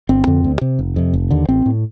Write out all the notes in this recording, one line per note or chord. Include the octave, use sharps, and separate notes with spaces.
G1 C4
F2 D3
D2
C3
F1
F2 C3
F1
D#2 D3
A1 C4
A2